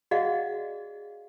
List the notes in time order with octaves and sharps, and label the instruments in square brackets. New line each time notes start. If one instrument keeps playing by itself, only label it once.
[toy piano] F#4 G#4 D5 D#5 F5 F#5